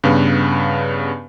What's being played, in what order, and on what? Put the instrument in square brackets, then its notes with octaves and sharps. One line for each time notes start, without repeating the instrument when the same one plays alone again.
[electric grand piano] G2 C#3 B3